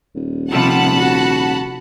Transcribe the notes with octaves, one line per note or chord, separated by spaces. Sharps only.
D#1
C3 F3 G3 F#5 A5 B5
F#4